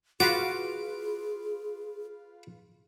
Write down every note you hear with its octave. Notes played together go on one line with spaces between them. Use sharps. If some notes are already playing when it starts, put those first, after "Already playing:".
F4 F#4 G#4 B4 F5 D6